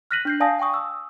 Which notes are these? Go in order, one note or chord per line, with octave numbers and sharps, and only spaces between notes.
F6 F#6 A#6 B6 D#7 F#7
D4 G6 C7
D5 F5 G#5 A5 D#6 A#6
G5 G#5 C#6 D#6
D#6 E6